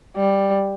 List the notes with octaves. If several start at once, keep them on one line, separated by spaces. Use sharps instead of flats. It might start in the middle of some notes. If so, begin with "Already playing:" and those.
G3